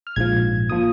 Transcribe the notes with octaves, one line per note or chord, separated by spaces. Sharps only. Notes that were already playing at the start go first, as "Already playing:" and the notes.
F6
A#1 G#2 F3 G#6
A#2 F3 D#6